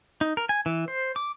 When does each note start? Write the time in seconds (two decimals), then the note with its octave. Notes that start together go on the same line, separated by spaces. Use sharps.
0.21 D#4
0.37 A#4
0.49 G#5
0.66 E3
0.88 C5
1.16 D6